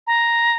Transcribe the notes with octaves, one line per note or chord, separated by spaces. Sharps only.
A#5